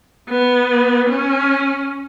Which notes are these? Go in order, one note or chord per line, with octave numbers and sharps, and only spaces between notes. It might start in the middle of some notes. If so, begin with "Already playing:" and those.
B3
C#4